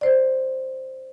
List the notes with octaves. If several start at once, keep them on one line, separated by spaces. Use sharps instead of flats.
C5 D5